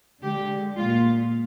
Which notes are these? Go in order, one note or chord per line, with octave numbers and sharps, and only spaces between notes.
D3 G#3 G4
A#2 G#3 F4